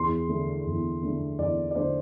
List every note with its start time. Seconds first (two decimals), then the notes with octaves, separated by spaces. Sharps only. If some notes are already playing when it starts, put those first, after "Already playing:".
Already playing: E2 C6
0.28 D3 A3 D4
0.66 E2
1.02 D3 A3 D4
1.38 E2 D5
1.71 D5
1.75 D3 A3 D4 C5